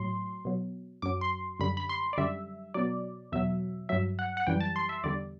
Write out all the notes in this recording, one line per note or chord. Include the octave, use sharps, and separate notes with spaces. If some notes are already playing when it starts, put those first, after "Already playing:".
Already playing: A2 F#3 C6
B2 F#3
F#2 F#3 D6
C6
F#2 D3 G3 B5
B5
C6
D5
F#2 D3 G3 E5
B2 F#3 D5
E2 B2 F#3 E5
G2 F#3 E5
F#5
F#5
F#2 E3 G3 G5
A5
C6
E5
E2 D3 G3 D5